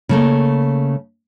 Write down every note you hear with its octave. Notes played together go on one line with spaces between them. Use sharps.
C#3 A3 A#3